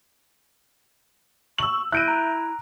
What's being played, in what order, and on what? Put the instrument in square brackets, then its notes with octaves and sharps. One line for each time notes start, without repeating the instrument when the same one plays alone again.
[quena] C#6 [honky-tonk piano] E6 F#7
[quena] E4 [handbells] E5 G6 A#6 [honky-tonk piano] F#6 D7 D#7
[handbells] A#5